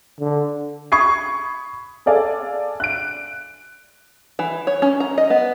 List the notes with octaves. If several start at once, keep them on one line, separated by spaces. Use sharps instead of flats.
D3
B5 C#6 D#6 G#6 C7
G#4 A4 D5 F5 G#5
F#6 D7
E3
C#5
C#4
A#5
D#5
B3